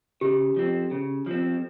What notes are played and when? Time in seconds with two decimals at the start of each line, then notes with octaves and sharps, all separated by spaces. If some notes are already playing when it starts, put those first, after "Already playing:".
0.21 C#3 G4
0.56 F3 C4
0.91 C#3
1.26 F3 C4